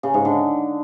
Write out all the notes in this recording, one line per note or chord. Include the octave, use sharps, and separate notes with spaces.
C#3
G#2
D3